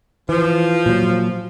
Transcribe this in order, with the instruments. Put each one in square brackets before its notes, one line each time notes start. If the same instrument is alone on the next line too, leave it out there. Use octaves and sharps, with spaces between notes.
[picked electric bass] E3 [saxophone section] F3
[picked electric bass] A#2 F#3